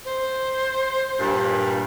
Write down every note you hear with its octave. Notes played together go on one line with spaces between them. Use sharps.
C5
G2 A#2